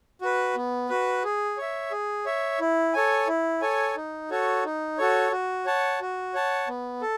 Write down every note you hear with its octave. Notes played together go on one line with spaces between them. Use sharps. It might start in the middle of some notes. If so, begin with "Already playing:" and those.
F#4 B4
B3
F#4 B4
G#4
C#5 E5
G#4
C#5 E5
E4
A4 C#5 G#5
E4
A4 C#5 G#5
D#4
F#4 A4 C#5
D#4
F#4 A4 C#5
F#4
C#5 F#5 A5
F#4
C#5 F#5 A5
B3
A4